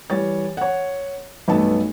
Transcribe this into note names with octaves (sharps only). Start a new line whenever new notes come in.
E3 G3 C#5 A6
C#5 F#5
B1 G2 A3 B3 A5